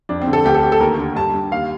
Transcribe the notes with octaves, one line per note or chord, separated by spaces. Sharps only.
F2 D4
C4
D3
A4
D2 G4
A4
D2 G4
A4
D#2 A#4
D3
G2 A5
G2
D#2 F5